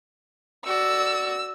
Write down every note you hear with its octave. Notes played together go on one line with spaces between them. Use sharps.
F#4 D5 E6